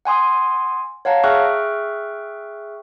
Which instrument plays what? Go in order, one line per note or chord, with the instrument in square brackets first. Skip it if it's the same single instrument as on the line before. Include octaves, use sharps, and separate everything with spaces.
[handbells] F#5 G#5 C6 D#6
C#5 F5 F#5 A5 A#5
G#4 E5 G5 C#6 F6 F#6